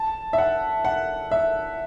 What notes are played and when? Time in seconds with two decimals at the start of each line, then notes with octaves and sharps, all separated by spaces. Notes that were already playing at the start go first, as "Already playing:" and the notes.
Already playing: A5
0.33 E5
0.38 F#5
0.85 F#5
1.31 E5